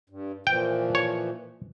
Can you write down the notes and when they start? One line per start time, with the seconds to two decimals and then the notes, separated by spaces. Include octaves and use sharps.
0.10 G2
0.47 A#2 E3 F3 G5
0.95 C#5